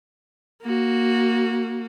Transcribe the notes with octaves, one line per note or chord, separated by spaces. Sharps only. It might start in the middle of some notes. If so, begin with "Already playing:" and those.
A#3 F#4